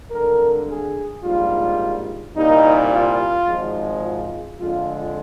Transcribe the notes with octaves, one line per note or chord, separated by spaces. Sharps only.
G#1 G2 D3 A#4
G#4
A#1 G#2 G3 F4
C2 A#2 G3 D#4
F4
G#1 G#2 F3 G#3
F4
F2 D3 G#3 F4